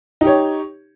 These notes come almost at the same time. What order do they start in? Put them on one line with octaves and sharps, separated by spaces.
D#4 G4 C#5